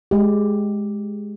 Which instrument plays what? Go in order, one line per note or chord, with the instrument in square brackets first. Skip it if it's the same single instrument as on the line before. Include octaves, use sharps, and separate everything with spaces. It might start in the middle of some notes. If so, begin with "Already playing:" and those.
[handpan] G#3 G4